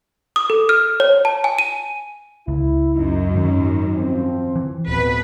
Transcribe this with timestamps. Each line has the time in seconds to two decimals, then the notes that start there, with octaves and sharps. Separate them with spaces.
0.36 D#6
0.50 A4
0.69 F6
1.00 C#5
1.25 A5
1.44 G#5
1.59 D#7
2.48 C#2 E4
2.96 F#2 D#4
3.34 G#2 D#3
3.95 F3 C4
4.55 E3
4.88 D1 F2 B2 B4